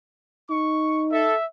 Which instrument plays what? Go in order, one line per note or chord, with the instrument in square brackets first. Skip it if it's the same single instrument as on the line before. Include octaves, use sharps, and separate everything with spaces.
[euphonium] D#4 [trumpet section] C#6
[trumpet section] A4 [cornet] E5